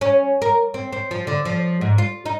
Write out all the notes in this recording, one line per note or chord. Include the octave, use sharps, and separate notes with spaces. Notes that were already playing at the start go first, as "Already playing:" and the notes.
C#4
A#4
C4
C4
F3
D3
F3
G#2
F4
D#4